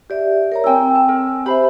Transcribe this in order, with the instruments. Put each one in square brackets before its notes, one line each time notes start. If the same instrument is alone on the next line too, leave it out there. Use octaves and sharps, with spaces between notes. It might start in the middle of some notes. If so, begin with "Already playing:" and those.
[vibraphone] G4 D5 E5
A#4 C#5 A#5
[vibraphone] C4 G#5 E6 [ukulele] E4 G5
[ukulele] A5
A#4
[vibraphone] G4 C5 E5 [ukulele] B5